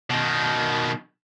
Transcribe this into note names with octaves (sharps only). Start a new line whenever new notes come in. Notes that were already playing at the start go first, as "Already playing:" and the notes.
B2 D#3